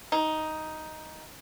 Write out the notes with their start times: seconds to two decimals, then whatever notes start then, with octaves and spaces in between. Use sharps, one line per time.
0.12 D#4